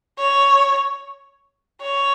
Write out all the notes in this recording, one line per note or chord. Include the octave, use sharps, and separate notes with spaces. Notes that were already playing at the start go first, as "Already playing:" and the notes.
C#5
C#5